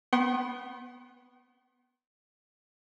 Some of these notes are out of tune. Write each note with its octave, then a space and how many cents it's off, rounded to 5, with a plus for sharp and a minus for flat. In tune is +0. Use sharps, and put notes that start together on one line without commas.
B3 +0 G5 -45 C6 +40